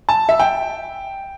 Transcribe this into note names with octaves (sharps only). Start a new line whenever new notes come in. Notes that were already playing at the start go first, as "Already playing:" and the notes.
A5
E5
G5